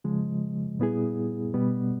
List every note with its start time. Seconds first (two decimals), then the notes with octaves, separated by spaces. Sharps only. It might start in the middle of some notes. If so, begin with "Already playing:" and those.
0.04 C#3 F3 G#3
0.79 A#2 G3 B3 E4 G#4
1.54 B2 G3 B3